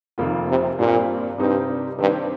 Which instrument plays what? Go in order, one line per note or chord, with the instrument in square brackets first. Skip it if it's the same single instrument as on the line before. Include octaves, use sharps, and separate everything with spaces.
[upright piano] F1 F2 D#3 A#3 F4
[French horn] C3
[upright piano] G2 G3 C4 [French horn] A#2
[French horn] G2 [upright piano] C3 G3 C4 D#4 C5
[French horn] G2 [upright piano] D#3 C4 G4